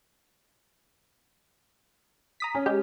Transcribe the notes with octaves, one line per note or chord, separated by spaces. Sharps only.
A#5 D#6 B6
C#4
G#3 G4